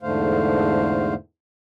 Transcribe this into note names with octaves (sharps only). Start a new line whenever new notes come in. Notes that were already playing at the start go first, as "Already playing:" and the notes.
E2 G#2 D3 A3 C5 F5